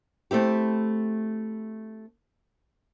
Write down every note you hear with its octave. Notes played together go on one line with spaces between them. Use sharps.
A3 C4 E4 G4